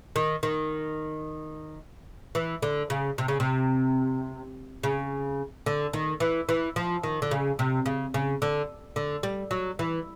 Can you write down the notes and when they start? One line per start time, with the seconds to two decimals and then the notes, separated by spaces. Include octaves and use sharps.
0.16 D#3
0.43 D#3
2.35 E3
2.62 D3
2.90 C#3
3.18 C3
3.28 C#3
3.40 C3
4.83 C#3
5.66 D3
5.93 D#3
6.20 E3
6.49 E3
6.76 F3
7.03 D#3
7.22 D3
7.31 C#3
7.59 C3
7.86 C#3
8.14 C#3
8.42 D3
8.96 D3
9.23 G3
9.51 F#3
9.79 E3